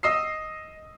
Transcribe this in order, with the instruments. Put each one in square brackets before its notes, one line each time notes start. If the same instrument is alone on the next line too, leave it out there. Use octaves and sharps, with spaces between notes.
[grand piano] D#5 D#6 E6 C7